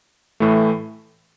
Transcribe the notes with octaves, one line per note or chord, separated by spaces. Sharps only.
A2 E3 A3